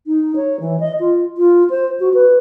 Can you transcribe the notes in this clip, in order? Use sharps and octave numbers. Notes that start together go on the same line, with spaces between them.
D#4
C#5
E3
D#5
F4
F4
C5
F#4
B4